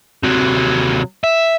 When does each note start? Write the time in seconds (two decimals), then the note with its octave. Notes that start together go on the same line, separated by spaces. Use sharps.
0.23 C3 F#3
1.24 E5